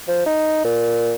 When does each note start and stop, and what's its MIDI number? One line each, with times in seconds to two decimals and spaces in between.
0.08 0.21 53
0.26 0.63 63
0.64 1.15 46